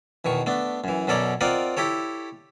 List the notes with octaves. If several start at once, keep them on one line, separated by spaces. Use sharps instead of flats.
E2 B2 D#3 C#6
A3 B3 D4
F#2 E3
F#2 B2 C#4 A4 D5 A#5
C4 F4 A#4 D5 D#5 F#5
E4 G4 A4 C#5